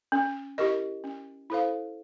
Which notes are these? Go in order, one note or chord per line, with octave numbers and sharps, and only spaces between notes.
C#4
E4 G4 A#4 D#5
C#4
E4 A4 C5 F5